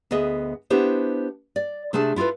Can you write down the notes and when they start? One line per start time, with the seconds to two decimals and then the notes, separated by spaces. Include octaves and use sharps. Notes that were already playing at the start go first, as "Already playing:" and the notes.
0.11 D2 B3 G#4 D#5 E5
0.70 B3 D4 E4 G4 C5
1.56 D5
1.93 C3 A3 D4 G#4 A5
2.16 E4 F4 G4 A4 B4